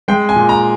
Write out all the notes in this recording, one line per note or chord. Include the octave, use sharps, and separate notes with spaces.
G#3 G5
G#5
A#2
A#5